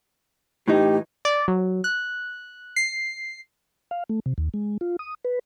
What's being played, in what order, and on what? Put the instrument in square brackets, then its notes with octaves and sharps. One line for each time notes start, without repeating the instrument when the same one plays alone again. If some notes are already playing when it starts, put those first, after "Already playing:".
[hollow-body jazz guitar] A2 E3 D#4 [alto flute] G4
[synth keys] D5
F#3
F#6
C7
[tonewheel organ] F5
A3
C3
D#2
G#3
F4
D#6
B4